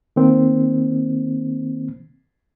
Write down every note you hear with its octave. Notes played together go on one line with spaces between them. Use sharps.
D#3 A#3 C4